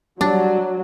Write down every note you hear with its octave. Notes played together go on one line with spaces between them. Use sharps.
F#3 G3 D4 D5